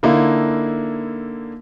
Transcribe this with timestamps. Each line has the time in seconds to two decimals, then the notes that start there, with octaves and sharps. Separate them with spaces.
0.03 D3 A#3 D#4 E4